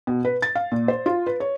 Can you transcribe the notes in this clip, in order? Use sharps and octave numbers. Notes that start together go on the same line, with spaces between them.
B2
B4
A6
F5
A#2
C5
F4
B4
C#5